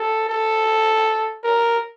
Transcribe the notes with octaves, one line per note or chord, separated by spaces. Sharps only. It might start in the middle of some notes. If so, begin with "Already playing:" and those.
Already playing: A4
A4
A#4